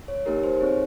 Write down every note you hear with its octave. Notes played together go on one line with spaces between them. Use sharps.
C#5
A#3 D#4 G4 A#4
C5
C4 D#4 G#4 C#5